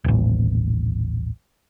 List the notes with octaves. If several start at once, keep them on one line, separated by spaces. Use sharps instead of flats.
D#1 A1